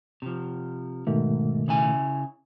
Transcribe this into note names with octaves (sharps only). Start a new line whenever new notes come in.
C3 F3
G#2 B2 D#3 A3
C#3 E4 G#5